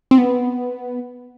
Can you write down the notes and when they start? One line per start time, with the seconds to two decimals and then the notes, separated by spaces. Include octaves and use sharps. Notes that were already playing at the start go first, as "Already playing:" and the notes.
0.11 C4
0.18 B3